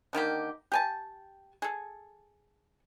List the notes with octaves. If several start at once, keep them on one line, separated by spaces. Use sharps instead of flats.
D3 D#3 A#3 G4
G4 G#5 A5
G#4 A4